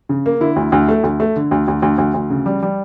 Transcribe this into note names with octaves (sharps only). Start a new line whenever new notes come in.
C#3
A#3
D3 E4
D2
D2
A3
D2
A3
D3
D2
D2
D2
D2
D2
C#3
G3
G3